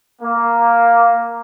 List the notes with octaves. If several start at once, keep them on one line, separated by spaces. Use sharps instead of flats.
A#3